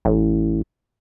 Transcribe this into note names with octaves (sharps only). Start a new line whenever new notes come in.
A1